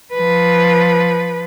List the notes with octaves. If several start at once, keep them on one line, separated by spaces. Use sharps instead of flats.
F3 B4